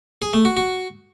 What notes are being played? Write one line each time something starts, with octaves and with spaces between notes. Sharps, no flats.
G#4
A3
F#4
F#4